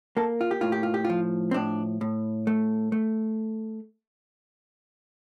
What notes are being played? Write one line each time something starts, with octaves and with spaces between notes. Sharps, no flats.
A#3 A4
F4
G4
A2 F4
G4
F4
G4
F3 F4
C4
A2 D4
A2
A3
A3